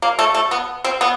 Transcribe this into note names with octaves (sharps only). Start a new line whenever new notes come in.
A#3
A3
A3
B3
C4
B3